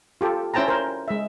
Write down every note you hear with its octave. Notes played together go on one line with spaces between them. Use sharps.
F4 G4 A4
C#4 E4 C5 G5 A5 A#5
A#4 C5
G#3 E5